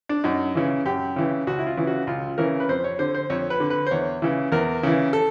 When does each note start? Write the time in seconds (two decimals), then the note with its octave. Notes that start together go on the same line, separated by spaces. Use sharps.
0.09 D4
0.24 F#2 D#4
0.55 C#3 E3
0.85 F#2 G4
1.16 C#3 E3
1.47 C#2 F#4
1.58 E4
1.67 F4
1.77 C#3 E3
1.87 F#4
2.07 C#2 F4
2.38 C#3 E3 A#4
2.60 B4
2.69 F2 C5
2.84 C#5
2.99 D3 C5
3.15 C5
3.30 F2 C#5
3.50 B4
3.60 D3
3.70 B4
3.87 C5
3.91 E2 C#5
4.22 C#3 E3
4.52 E2 A#4
4.83 C#3 E3
5.13 A4